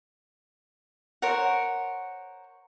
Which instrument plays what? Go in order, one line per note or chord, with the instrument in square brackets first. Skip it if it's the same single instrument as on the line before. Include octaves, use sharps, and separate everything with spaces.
[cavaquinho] A#4 C5 C#5 F#5